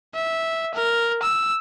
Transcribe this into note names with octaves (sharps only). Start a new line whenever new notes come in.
E5
A#4
E6